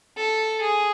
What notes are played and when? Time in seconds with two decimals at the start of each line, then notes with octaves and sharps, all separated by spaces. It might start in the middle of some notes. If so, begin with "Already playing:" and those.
0.17 A4
0.61 G#4